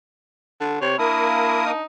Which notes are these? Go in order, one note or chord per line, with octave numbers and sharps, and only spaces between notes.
D3
C3 C#5
A#3 D4 E4 A#4 D#6
D#4